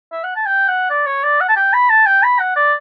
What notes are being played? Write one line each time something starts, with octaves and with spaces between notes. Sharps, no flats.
E5
F#5
A5
G5
F#5
D5
C#5
D5
F#5
A5
G5
B5
A5
G5
B5
F#5
D5